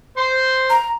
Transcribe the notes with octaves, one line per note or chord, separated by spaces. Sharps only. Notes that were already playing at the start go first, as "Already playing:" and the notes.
C5 C6
A#5